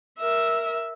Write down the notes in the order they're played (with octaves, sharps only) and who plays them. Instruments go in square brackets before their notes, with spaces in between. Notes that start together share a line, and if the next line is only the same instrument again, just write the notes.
[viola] A#4 E5